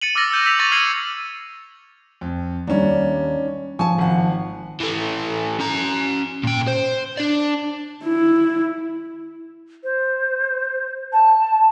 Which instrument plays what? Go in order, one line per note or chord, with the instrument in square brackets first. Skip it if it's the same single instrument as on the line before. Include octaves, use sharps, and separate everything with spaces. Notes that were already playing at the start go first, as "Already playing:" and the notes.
[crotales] A6 C#7 D#7 F#7
D6 E6 F6 A6 A#6
E6 F6 G6 D#7
E6 B6 F7
C#6 D6 A6 A#6 D#7 F#7
F6 G#6 C7 C#7 D#7 F#7
[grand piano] F2
[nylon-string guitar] D#2 G3 [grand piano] C#4 D4
[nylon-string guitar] F3 A5 [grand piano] G#5 C#6
[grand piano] G#1 F#5
[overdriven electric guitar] E3 A3
C#4 A#5
A#2 G5
C5
D4 D5
[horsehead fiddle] E4
[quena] C5
A5